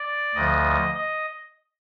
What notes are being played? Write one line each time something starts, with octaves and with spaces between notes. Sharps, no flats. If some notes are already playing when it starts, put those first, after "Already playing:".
Already playing: D5
D2 D3 F3 D#5
D#5